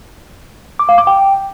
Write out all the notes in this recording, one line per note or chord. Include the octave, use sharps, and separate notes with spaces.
D6
F5
D6
G5